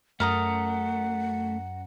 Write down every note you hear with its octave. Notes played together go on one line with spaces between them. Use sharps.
F#2 A3 A#4 F#5 A#5 D#6